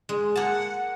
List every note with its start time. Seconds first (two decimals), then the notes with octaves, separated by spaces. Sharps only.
0.09 G#3
0.36 A#3 F#5 A5